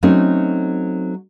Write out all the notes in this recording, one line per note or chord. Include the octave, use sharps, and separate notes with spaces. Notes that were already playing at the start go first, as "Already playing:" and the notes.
F#3 A3 C4 C#4 D#4